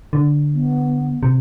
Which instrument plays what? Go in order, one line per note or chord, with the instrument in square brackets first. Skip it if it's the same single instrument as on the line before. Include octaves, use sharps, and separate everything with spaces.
[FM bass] D3
[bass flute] B3
[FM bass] C3